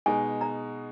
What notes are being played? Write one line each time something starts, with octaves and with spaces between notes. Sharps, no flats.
B2 G#3 D#4 G#5
A#5